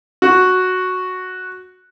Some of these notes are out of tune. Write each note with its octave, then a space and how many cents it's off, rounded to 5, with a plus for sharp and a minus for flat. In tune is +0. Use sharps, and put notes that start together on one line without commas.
F#4 -5